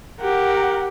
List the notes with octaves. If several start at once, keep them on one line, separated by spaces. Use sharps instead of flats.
G4 A#4 F#5